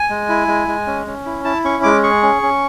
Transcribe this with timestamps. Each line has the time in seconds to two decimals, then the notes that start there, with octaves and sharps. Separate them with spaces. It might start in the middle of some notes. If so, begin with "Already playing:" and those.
Already playing: G#5
0.10 G#3
0.29 E4
0.48 G#3
0.68 G#3
0.87 C#4
1.07 C#4
1.26 E4
1.45 E4 A5
1.64 C#4 C#6
1.83 G#3 D6
2.03 G#4 C#6
2.23 C#4
2.42 C#4